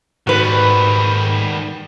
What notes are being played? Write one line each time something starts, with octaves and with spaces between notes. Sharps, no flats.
G#2 D#3 G3 F#4 B4